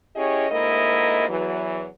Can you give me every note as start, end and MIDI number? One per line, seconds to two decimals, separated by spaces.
0.15 0.46 61
0.15 0.46 64
0.15 0.46 67
0.15 0.46 68
0.15 0.46 73
0.15 0.46 75
0.50 1.26 38
0.50 1.26 44
0.50 1.26 58
0.50 1.26 64
0.50 1.26 70
0.50 1.26 75
1.28 1.86 40
1.28 1.86 52
1.28 1.86 54